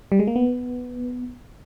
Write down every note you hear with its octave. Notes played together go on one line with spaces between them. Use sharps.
G3
G#3
A#3
B3